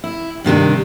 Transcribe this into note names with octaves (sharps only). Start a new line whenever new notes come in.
E4
G2 C3 D#3 D4